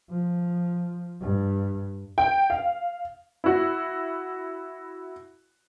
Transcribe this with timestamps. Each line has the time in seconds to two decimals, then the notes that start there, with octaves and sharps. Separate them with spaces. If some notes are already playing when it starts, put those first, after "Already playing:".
0.10 F3
1.21 G2
2.18 G5
2.50 F5
3.44 E4 F#4